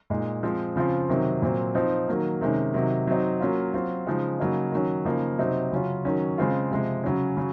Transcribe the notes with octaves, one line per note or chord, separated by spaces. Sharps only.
A#2 G#3 D#4
F3 G#3 C4
C#3 F3 C4 F4
C3 D#3 F#3 C4
A#2 F#3 C4
F3 C4 D#4
D#3 F#3 A#3
C3 D#3 G#3 C#4
C3 D#3 F#3
F#3 C4 D#4
F#3 A#3 C#4 F4
F#3 C4 F4
C#3 F3 G#3 D#4
C#3 F#3 A#3 D#4
D#3 F#3 C#4
C#3 F3 A#3 D#4
C3 F#3 C4 D#4
C#3 F#3 C#4 F4
D#3 F#3 C#4
C#3 G#3 C4 F4
C3 F3 G#3
C#3 F#3 C#4
C#3 F#3